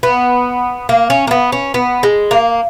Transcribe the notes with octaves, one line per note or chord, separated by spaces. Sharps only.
B3
A#3
C#4
A#3
B3
C#4
B3
G#3
A#3